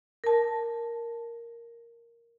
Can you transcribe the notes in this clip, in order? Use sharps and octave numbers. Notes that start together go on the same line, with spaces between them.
A#4 A5